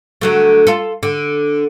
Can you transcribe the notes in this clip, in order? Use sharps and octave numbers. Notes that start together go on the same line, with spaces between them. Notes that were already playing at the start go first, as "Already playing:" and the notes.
D3 F#3 A3
F4 A4
D3